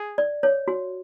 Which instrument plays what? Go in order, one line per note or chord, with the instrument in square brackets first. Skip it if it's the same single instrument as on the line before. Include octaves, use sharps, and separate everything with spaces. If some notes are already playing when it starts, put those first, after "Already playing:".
Already playing: [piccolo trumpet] G#4
[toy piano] D5
C#5
F#4